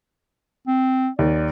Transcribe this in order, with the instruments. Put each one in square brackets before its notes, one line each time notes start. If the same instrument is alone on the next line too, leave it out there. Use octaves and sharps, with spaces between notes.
[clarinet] C4
[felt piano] D#2 [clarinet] D5